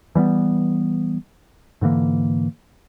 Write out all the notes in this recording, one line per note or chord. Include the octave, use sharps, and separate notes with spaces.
E3 G3 A#3 B3
G#2 D3 E3 A#3